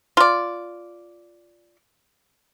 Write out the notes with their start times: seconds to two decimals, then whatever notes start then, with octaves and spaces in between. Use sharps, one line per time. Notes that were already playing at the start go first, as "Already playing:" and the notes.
0.17 F4 D5